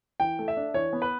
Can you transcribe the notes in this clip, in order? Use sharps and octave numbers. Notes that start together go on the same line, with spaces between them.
E3 G5
A3
E5
D4
E3 C#5
B3
B4